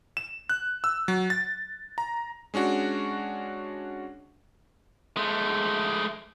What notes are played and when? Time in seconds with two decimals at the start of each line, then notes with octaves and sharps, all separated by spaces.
0.17 E7
0.49 F#6
0.84 E6
1.08 F#3
1.30 A6
1.98 A#5
2.54 G#3 C#4 D4 F#4
5.17 G#3 A3